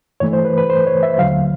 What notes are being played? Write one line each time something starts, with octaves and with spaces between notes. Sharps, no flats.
G2 E3 A3 C#5
C5
B4
B4
C5
C#5
E5
D#2 D3 F#3 F5